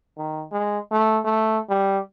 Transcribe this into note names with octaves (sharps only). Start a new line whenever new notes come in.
D#3
G#3
A3
A3
G3